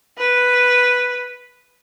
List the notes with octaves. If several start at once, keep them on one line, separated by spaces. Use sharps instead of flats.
B4